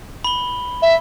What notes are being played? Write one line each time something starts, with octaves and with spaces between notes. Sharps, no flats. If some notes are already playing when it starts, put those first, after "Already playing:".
B5 G7
E5